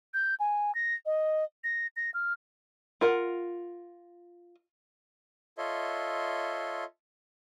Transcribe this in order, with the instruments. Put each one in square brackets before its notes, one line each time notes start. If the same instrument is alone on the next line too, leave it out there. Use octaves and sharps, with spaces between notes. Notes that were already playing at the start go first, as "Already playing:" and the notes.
[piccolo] G6
G#5
A#6
D#5
A#6
A#6
F6
[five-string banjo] F4 A#4 F#5
[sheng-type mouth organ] F4 A4 C#5 D#5 E5 C6